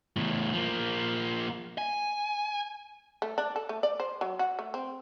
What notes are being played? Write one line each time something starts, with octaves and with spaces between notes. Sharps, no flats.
E2 A2
F3 A#3
G#5
A3
D4
A4
A3
D5
C5
F#3
F#4
A3
C4